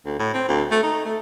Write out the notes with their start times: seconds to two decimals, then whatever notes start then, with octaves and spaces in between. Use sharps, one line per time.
0.06 D2
0.19 A2
0.34 C4
0.48 D2
0.71 A3
0.83 D#4
1.05 A3